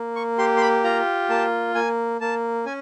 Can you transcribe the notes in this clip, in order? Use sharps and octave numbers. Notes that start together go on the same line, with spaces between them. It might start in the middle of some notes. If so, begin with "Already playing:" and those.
Already playing: A#3
C#6
G4 C6
C6
B5
F4 A#5
A#3 A5
A#3 G#5
A#3 A5
C#4 G#5